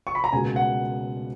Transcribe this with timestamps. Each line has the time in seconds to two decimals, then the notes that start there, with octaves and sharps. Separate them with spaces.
0.07 C#6
0.15 B5
0.24 A#5
0.32 C#2 B2 A#3 G#5
0.56 F#5